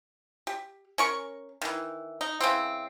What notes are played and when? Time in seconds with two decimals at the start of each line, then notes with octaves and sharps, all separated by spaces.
0.47 G4
0.98 C#4 A#4 C#6
1.62 D#3 E3
2.21 D#4
2.41 C#3 E3 C4